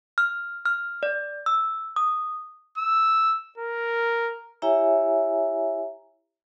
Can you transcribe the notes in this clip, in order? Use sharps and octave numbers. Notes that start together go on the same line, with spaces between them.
F6
F6
D5
E6
D#6
E6
A#4
E4 G4 C#5 E5 G#5 A#5